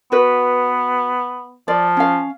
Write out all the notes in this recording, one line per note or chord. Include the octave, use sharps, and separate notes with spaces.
B3 F#4 B4
F3 D5
C#4 F5